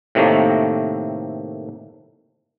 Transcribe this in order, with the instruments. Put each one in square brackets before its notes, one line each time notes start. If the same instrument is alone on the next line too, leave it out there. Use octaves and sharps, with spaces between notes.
[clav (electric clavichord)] A2 C3 D#3 A3 A#3